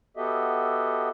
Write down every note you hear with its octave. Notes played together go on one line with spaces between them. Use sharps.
B3 F#4 G4 A4 D#5 E5